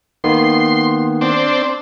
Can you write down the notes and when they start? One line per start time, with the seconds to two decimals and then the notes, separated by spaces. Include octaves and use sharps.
0.24 D#3 A#3 B3 C6
1.21 C4 D4